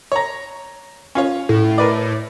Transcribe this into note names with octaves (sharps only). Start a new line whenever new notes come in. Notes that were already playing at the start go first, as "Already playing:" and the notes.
C#5 A#5
C#4 F4 C#5
A2
A#4 B4 D5